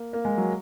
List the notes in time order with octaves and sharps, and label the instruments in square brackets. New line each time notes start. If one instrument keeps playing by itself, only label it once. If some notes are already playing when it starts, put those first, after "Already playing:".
Already playing: [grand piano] A#3
A#3
G#3
F#3